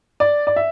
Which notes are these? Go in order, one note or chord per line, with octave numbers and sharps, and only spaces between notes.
D5
D5
E5